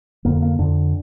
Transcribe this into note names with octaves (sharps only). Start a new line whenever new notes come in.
F2 D3 A#3
A#3
F2 D3 D4